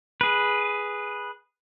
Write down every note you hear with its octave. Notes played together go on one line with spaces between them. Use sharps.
G#4 B4